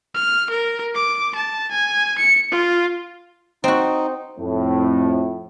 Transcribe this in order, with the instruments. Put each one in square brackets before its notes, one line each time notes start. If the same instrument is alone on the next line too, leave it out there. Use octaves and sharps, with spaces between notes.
[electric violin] F6
A#4
D6
A5
G#5
C#7
F4
[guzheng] C4 F#4 [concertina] D#4
[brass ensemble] F2 A2